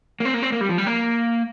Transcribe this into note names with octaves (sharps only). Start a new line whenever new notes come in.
A#3
C4
A#3
C4
A#3
G3
F3
G3
A#3